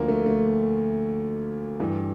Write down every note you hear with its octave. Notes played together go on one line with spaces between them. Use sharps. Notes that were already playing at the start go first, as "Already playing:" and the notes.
Already playing: D2 D3 F3 A#3
A3
A3
G2 E3